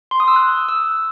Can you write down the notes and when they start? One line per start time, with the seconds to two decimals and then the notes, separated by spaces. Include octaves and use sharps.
0.11 C6
0.20 D#6
0.28 E6
0.36 F#6
0.52 E6
0.69 E6